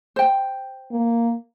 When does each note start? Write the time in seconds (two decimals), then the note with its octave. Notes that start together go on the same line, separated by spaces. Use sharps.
0.16 C5 G5
0.92 A#3